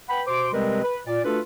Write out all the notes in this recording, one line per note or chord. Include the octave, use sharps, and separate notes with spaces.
B4 F#5 G5 B5
B2 C5 C6 D6
C3 G3 G#3 C4 A#4 B4
B4
A#2 D5
A3 D4 F4 F#4 A4 B4